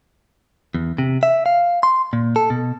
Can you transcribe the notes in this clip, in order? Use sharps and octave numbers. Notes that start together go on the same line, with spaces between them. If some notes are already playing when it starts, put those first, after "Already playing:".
E2
C3
E5
F5
C6
A#2
A4
B2